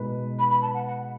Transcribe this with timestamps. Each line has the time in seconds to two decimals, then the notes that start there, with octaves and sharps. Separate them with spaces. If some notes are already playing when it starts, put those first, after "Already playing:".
Already playing: B2 G#3 D#4 G#4 B4
0.39 B5
0.51 B5
0.62 A5
0.74 F#5
0.87 F#5